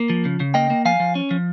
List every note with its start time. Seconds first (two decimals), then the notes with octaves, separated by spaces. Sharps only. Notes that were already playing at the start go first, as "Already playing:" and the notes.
Already playing: A#3
0.10 F3
0.25 C#3
0.40 C#3
0.54 A#3 D#5 G5
0.70 A#3
0.85 F3 F5 G#5
1.00 F3
1.15 C#4
1.31 F3